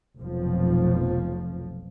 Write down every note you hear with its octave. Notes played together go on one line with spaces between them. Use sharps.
F1 B1 F2 F3